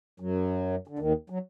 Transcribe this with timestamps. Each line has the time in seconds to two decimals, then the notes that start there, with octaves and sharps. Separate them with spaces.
0.20 F#2 F#3
0.88 D3
0.99 D#2 D#3
1.30 F#3